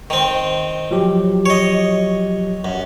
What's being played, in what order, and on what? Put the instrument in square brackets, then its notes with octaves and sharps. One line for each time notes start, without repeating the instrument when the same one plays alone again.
[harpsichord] D#3 C4
[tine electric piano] F3 F#3 G4
[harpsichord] C#5 D#5
F#2